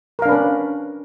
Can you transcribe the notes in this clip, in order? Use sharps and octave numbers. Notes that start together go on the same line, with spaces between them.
C#4 D4 A#4 B4 F5